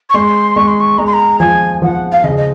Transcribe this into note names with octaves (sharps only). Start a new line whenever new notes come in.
C#6
G#3 C6
G#3 C#6
C6
C#6
G#3 A#5
C6
A#5
F3 G#5
F3 F#5
F5
C#3 D#5
D#5